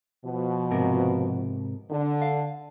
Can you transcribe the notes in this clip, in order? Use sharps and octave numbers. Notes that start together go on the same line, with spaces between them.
B2 F3
G#2 C3 A#4
D3
F5